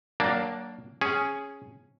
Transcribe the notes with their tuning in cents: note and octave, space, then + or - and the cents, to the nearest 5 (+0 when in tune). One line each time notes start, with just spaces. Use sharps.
F#3 +25 A#3 +0 D4 +0
C#4 +0 G#4 +0